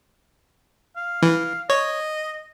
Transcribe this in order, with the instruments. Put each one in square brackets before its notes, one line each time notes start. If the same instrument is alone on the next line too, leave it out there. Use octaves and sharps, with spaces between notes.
[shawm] F5
[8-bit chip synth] E3
[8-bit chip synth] C#5 [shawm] D#5